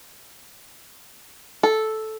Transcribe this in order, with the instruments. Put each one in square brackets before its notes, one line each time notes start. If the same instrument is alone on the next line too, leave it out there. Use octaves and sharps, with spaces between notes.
[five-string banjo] A4